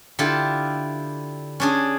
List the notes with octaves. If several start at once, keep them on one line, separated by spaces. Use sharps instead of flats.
D3 E4 F4 G4
C#4 D4 G#4